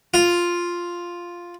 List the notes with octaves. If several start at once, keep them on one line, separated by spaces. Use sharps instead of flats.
F4